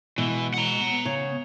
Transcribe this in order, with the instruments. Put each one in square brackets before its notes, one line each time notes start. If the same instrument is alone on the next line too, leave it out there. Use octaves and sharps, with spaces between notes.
[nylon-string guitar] B2 [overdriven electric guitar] E3 [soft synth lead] G#3
[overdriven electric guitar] F#5 A#5
[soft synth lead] B3
[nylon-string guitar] C#3